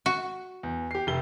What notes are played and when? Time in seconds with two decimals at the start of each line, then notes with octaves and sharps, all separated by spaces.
0.06 F#4
0.63 E2
0.91 G4 C7
1.07 F1 G4 G7